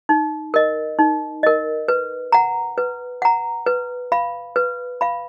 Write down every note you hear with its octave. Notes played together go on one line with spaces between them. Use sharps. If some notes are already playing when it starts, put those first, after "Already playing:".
D#4
A#4 D#5
D#4
A#4 D#5
B4
F#5 A#5
B4
F#5 A#5
B4
F5 B5
B4
F5 B5